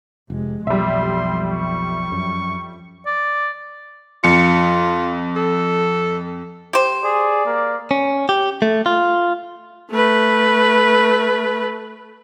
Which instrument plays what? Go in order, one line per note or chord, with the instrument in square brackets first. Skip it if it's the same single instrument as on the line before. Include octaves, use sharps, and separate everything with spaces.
[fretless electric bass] F1 [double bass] C3 G#3
[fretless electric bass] B1 [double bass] F2 [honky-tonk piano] G3 E5 [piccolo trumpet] C6
[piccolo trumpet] C#6
[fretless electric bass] F#2
[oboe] D5
[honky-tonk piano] F2 C#7 [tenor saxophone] F4
[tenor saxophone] A4
[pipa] G4 C5
[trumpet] G#4 [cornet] D5
[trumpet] A#3
[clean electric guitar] C#4
G4
A3
F4
[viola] A3 B4